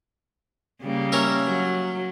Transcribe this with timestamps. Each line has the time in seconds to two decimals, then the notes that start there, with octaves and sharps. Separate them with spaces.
0.81 C#3 G3 A#3
1.12 C#4 A#4 E5
1.45 F#3